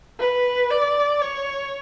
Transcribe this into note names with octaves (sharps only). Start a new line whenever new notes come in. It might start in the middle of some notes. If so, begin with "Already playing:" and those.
B4
D5
C#5